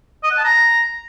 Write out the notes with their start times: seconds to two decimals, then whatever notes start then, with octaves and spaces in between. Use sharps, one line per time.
0.23 D#5
0.30 F#5
0.38 A5
0.45 A#5